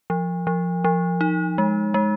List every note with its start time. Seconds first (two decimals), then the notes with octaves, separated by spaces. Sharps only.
0.10 F3
0.47 F3
0.84 F3
1.21 D#4
1.58 G#3
1.94 G#3